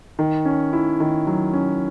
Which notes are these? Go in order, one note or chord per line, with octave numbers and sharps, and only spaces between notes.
D#3
C#4
E4
D#3
F#3
C#4